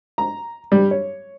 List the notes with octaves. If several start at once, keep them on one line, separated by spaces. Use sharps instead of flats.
A#5
G3
C#5